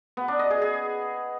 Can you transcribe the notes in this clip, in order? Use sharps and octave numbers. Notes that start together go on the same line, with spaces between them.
B3
D4
D#5
G#4
G#4